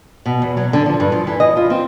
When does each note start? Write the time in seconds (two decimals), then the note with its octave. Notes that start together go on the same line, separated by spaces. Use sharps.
0.26 B2
0.42 E2
0.57 F#3
0.73 D3
0.86 F3
1.00 G2
1.12 F3
1.27 E3
1.40 D#5
1.57 F4
1.70 C4